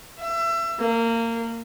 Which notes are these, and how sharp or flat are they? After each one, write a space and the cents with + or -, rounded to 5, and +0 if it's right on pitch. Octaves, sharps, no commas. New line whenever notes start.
E5 +30
A#3 -25